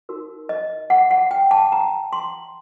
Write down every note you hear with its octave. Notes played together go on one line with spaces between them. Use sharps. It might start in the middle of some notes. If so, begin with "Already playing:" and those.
D#4 F#4 A#4
D#5
F#5
F#5
G5
A5
A#5
C6